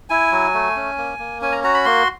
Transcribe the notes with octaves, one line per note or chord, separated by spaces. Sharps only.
E4 G#5
F#3
A3
C#4
A#3
A#3
C#4 G#5
A#5
F#4 A#5
B5
A#3 C6